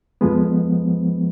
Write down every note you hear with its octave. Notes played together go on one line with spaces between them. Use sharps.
F2 F3 G#3 B3